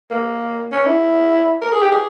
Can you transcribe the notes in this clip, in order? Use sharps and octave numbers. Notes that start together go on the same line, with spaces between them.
A#3
C#4
E4
A#4
G#4
G4
G#4